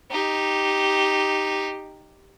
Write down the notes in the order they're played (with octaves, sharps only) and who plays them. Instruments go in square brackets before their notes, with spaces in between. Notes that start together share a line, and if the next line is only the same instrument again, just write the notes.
[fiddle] D#4 G4